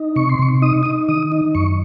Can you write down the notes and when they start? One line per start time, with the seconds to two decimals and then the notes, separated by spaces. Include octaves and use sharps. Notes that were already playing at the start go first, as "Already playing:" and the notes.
Already playing: D#4
0.16 C3 C#6
0.29 C6
0.39 C3 C#6
0.62 D#4 D#6
0.83 D#6
0.86 D#4
1.09 D#3 D#6
1.32 D#4
1.55 F#2 C#6